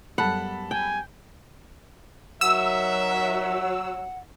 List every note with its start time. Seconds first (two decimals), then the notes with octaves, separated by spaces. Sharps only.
0.18 F#2 G3 B3 A4 F#5 B5
0.71 G5 G#5
2.41 F#3 D#4 A#4 E5 F#5 E6